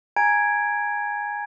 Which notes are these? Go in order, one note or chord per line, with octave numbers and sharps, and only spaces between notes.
G#5 A#5 G#6 D7